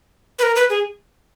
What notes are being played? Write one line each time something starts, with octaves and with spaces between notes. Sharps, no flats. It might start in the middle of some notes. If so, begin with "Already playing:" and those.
B4
A#4
B4
G#4